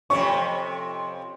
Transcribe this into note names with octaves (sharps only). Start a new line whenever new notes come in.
F2 C3 C#4 C#6